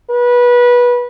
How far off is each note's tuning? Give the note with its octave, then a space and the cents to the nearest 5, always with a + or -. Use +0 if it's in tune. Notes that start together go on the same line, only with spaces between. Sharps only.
B4 -20